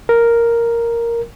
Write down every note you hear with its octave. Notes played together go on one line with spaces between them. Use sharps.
A#4